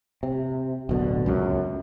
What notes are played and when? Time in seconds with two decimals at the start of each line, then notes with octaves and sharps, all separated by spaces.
0.23 C3
0.89 D1 B2 D3
1.26 C#2 F#2